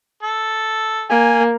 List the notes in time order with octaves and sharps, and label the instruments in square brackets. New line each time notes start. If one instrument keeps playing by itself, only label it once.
[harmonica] A4
[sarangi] A#3 [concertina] G#5